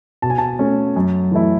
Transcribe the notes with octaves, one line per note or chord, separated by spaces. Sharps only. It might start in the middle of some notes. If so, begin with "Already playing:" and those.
B2 A5
G#5
A5
A3 C#4
F#2
E3 A3 E4